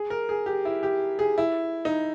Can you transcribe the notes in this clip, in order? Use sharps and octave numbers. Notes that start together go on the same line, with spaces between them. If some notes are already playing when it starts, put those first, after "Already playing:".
Already playing: G#4
A#4
G#4
G4
E4
G4
G#4
E4
D#4